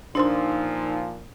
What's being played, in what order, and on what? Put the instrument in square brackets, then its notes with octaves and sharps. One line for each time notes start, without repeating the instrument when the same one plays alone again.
[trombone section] A#2 F3 [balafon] D4 C5 C6 [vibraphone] D#4 E6